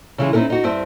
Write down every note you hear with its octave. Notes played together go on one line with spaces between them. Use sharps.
C#3 E3 G#3
C4 C#4 D#4 E4 F#4 A#4
D#4 F#4
G2 C4 E4 C5 E5